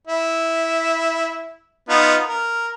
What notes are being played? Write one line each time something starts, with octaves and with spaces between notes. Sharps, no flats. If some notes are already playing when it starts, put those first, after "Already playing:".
E4
B3 D#4 F4
A#4